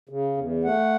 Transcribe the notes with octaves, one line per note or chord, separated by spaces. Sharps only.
C#3
E2
A3 F#5